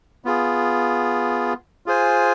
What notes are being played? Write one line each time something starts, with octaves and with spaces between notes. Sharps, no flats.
B3 F4 G#4
F4 G#4 C5 G#5